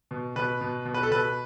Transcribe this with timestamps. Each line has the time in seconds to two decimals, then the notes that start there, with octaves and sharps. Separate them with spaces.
0.11 B2
0.36 B2 B4
0.61 B2
0.85 B2
0.94 B4
1.03 A4
1.11 B2 B4